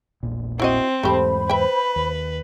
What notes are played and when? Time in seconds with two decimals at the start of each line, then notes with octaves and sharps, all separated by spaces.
0.23 E1 A#1 A#2
0.60 C4 E4 F#4 D#5
1.03 E2 G#2 A3 G4 A4 C5 B5
1.49 B4 E5 G5
1.96 D#2